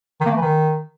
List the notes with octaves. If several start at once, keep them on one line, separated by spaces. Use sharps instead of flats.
D#3
A#3
A3
E3
D#3